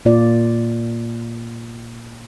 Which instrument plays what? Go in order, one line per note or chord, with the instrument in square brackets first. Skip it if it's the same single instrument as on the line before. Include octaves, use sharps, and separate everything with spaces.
[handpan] A#2 A#3 F4 D5